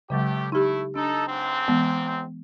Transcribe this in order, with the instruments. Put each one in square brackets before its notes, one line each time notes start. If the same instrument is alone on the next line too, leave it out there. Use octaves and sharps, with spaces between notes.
[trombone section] A2 A3 G4 [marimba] C#3 F#3 G#3
[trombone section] A3 E4 [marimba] D#4 G4
[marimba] D4 [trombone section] D#4 A4
[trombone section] C#2 G#2 C4
[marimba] E3 G#3 B3